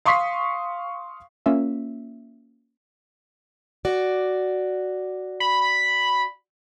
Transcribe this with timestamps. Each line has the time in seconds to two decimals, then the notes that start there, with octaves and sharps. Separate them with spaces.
0.05 F5 C6 C#6 D#6 B6 C7
1.46 A#3 C#4 F4 E5
3.85 F#4 D5
5.40 B5